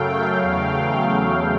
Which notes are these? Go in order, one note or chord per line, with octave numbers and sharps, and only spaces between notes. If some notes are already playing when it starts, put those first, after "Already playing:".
Already playing: F#2 C#3 F#3 A3 F5 G5
E2 C#3 F#3 A3 F5 G5